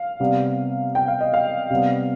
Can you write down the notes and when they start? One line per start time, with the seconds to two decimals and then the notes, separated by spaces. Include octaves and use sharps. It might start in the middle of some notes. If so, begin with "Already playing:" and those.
Already playing: F5
0.20 C3 G3 B3
0.95 G5
1.08 F5
1.21 D#5
1.33 F5
1.70 C3 G3 B3